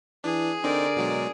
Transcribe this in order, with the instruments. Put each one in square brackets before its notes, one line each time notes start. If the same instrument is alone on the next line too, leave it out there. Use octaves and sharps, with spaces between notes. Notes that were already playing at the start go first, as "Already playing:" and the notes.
[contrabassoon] E3 [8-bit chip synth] D4 [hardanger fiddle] G#4
[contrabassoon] D3 [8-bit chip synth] C4 D#4 [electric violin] A#4 D5
[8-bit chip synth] B2 F#3 G#3